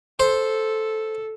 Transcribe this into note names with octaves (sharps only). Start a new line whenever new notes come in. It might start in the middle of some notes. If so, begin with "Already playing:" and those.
A4 C5